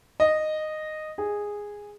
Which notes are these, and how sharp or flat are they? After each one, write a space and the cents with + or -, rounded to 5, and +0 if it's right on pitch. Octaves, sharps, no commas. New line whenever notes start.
D#5 -10
G#4 -10